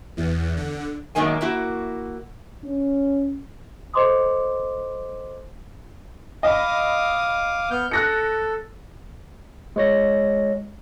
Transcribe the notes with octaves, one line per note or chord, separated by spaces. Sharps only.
E2
D3
F#2 B2 D#3 G#3 A#3 G#5
A#3 E4 F#4
C#4
A4 C5 D#5 C6 D6 D#6
D#5 F5 B5 D6 D#6
B3 F6 G6
A4 F#6 A#6 C#7
G#3 C#5 A#6